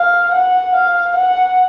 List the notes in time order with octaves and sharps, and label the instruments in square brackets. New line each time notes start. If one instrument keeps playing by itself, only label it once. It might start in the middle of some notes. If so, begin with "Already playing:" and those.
Already playing: [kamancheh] F5
F#5
F5
F#5